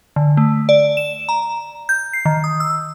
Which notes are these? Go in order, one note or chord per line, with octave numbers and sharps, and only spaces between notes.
D3
A3
D5
E7
A#5
G6
C7
D#3
D#6
E6